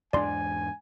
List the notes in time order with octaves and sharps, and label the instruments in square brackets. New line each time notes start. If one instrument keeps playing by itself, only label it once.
[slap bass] E2 G#2 D4 [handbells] D5 C6 [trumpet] G#5